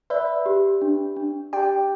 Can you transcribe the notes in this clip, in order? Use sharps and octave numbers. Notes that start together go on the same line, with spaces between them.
B4 D5 E5
G4
D4
D4
G4 D5 G5